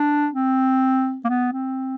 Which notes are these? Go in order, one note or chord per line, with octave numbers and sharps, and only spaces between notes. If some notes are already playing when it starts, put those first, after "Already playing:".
Already playing: D4
C4
A#3
B3
C4